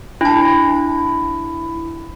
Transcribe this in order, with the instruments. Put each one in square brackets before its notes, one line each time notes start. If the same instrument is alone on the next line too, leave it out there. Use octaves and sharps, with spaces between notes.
[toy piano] D4 A5 [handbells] E4